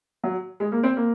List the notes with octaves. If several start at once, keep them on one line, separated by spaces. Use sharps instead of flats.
F#3
G#3
A#3
C4
A#3